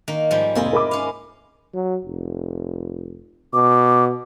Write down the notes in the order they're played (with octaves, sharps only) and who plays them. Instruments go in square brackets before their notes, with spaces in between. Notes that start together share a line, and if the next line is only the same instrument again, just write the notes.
[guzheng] D#3 A#3
G#2 F3 G3
[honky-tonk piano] F1 A#3 G#5 [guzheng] E4 F4 D#5
[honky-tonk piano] A#4 B5 D6
[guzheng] C#4 F5
[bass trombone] F#3
F1
[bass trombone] B2 [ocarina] D6